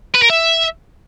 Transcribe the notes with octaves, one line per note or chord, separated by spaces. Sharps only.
B4
A#4
E5